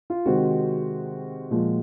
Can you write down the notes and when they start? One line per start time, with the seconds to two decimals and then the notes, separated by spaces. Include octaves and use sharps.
0.10 F4
0.26 C3 D#3 G#3 C4 F#4
1.51 A#2 F3 G#3